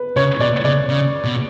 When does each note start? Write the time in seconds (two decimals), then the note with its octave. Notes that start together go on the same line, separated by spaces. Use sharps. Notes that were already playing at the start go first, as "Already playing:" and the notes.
Already playing: B4
0.16 C#3 C#5
0.40 B2 D5
0.65 C#3 D5
0.89 C#3
1.24 B2